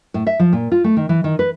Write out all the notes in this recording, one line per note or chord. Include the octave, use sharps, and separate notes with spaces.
A2
E5
F3
A#2
F4
A3
D#3
E3
D#3
B4